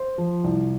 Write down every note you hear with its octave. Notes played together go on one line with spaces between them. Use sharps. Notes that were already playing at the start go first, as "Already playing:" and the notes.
Already playing: C5
F3
C2